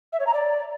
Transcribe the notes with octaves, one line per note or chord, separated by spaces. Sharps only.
E5
C#5
A#5
D5